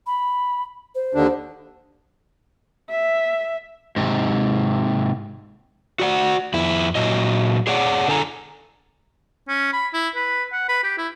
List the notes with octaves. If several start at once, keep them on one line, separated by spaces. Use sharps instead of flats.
B5
C5
D#2 D3 D4
E5
G#2 C3
F#4 D5 F#5
F2 E4
A#2 F#3 D#5
G#4 C#5 D5 F#5
D3 A4 G#5 A#5
C#4
B5
E4
B4
F#5
B4
G4
E4